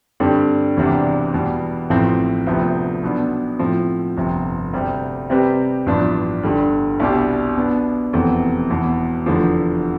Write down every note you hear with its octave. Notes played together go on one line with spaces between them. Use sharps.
G2 D3 G3 C4 G4
E1 E2 C3 G3 D4
E2 B2 G3
A1 A2 F3 C4
D2 C3 F3 B3
B1 B2 B3 D4
A2 F3 C4
G1 F2 C3
D2 C3 G3
C3 G3 C4 G4 B4
A1 G2 F3 B3 D4
G1 G2 D3 G3
C2 B2 G3 D4 G4
B2 B3 D4
F1 E2 B2 A3 C4
E1 E2 B2
F1 E2 D3 F3